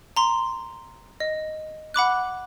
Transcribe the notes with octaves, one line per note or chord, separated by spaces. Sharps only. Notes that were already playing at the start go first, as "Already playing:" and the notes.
A#5 C6
D#5
F#5 B5 D6 F#6